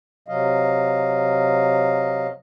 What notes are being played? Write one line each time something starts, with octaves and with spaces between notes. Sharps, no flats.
C3 F#3 D#5 F5